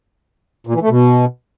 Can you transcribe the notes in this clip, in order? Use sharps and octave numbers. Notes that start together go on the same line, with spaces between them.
A#2
E3
A3
B2